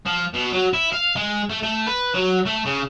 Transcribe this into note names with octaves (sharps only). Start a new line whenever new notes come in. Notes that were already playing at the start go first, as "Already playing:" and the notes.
F3
B2
F#3
E4
F5
G#3
A3
A3
B4
F#3
A3
C#3